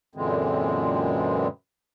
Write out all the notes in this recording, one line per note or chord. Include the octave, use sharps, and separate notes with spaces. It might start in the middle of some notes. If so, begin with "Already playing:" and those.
F#2 A#2 D3 E3 G#3 C4